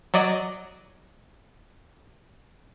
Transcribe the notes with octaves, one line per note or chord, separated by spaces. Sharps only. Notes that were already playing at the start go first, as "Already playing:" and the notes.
F#3 D5 D#5